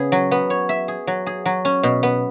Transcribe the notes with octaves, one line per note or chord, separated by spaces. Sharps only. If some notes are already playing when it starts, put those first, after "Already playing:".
Already playing: C#3 B3 G#4
F#3
B3
C#5
E5
G#4
F#3
G#4
F#3
C#4
B2
B3